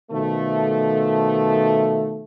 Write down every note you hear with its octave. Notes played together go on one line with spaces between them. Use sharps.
B2 D#3 F3 A3